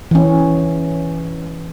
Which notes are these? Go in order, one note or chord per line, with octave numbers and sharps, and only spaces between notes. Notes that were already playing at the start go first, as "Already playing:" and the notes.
E3 C#4